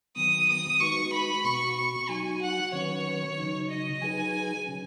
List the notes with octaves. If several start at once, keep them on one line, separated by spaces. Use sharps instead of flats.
D#3 F#3 B3 D#6
D#6
G#3 D#4 F#4 B4 C#6
B5
B2 B3 F#4 C#6
C#6
F#3 D#4 F#4 G#5
F#5
D#3 F#3 C#4 B4 C#5
C#3 F#3 D#4
D#5
F#3 D#4 G#4 B4 G#5
C#3 F#3 C#4